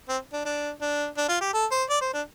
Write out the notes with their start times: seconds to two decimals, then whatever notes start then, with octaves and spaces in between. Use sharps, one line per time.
0.09 C4
0.33 D4
0.45 D4
0.81 D4
1.17 D4
1.28 F4
1.41 G4
1.53 A4
1.71 C5
1.89 D5
2.01 C5
2.13 D4